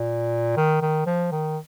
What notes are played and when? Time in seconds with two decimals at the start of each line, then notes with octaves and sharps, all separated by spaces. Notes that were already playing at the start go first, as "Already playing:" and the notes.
Already playing: A#2
0.57 D#3
0.81 D#3
1.06 F3
1.32 D#3